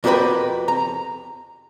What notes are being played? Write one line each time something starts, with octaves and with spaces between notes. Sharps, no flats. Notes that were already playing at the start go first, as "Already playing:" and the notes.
F2 F#4 G4 A#4 B4 B5
A#5